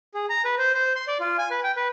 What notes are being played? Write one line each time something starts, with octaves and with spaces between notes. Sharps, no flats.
G#4
A#5
B4
C5
C5
C6
D5
F4
G#5
B4
G5
B4